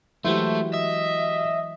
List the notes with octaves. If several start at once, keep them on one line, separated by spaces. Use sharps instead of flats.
E3 F#3 G#3 A3 E4 F#4 G4 C5
D#5 E5